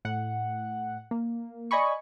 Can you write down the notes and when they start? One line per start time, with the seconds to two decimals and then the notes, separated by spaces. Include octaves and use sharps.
0.05 A2 F#5
1.11 A#3
1.71 D5 D#5 G#5 B5 C#6